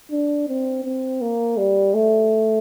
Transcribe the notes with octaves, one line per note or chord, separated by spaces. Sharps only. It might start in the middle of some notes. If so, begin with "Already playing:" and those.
D4
C4
C4
A#3
G3
A3